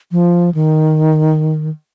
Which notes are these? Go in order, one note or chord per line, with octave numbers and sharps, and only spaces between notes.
F3
D#3